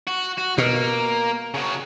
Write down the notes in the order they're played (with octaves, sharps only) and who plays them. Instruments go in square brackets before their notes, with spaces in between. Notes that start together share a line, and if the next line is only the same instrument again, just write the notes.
[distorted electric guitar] F#4
F#4
[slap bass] B2 [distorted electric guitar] A#3
[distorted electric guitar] C#3 F#4